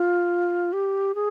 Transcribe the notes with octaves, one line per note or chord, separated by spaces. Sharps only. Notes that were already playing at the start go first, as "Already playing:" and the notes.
Already playing: F4
G4
G#4